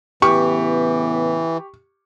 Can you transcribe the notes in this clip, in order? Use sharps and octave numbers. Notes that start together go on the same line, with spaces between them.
A2 C#3 E3 B3 G4 C#6